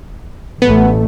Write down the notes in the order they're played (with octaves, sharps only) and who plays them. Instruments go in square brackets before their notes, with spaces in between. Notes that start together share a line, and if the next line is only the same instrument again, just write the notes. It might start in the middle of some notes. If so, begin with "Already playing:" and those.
[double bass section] A1 A3 [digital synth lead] B3